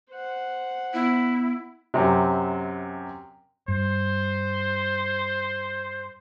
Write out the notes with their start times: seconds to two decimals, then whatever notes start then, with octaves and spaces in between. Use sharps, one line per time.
0.12 C5 F#5
0.94 B3 E4
1.94 F#2 C3
3.68 G2 C5